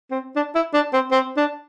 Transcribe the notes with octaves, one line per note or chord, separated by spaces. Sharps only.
C4
D4
E4
D4
C4
C4
D4